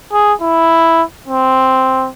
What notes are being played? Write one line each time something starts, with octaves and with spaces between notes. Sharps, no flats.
G#4
E4
C4